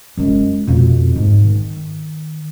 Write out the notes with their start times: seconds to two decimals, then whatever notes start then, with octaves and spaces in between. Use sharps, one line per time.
0.17 F#2 G#3
0.67 F2 B2
1.16 G#2
1.44 D#3